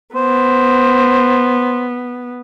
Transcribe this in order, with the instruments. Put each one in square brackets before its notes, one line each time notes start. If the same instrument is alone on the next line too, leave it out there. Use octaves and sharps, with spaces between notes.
[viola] B3 [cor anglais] C5